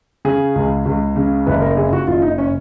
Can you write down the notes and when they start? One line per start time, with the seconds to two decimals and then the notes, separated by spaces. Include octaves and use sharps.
0.25 C#3 G#4
0.56 C#2
0.85 C#2
1.16 C#3
1.46 F#1 B4
1.62 A#4
1.77 C#3 G#4
1.93 F#4
2.07 F#1 F4
2.22 D#4
2.38 C#4